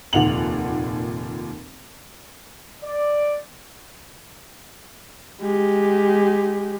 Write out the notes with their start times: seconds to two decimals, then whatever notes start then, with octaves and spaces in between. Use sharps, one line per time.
0.13 F1 D#2 A#2 F#5 F7 F#7
2.83 D5
5.42 G#3 G4